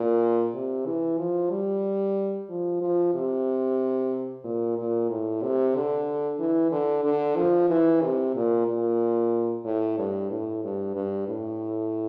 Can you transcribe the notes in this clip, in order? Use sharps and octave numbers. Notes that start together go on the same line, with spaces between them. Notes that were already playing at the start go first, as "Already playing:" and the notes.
Already playing: A#2
C3
E3
F3
G3
F3
F3
C3
A#2
A#2
A2
C3
D3
E3
D3
D3
F3
E3
C3
A#2
A#2
A2
G2
A2
G2
G2
A2